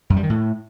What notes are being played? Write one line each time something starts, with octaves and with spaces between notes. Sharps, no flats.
F#2
G3
D#3
A2